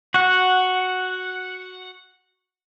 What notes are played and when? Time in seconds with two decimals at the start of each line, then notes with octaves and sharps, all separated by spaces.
0.14 F#4 F#5